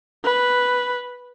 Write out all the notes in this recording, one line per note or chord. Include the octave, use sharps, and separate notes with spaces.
B4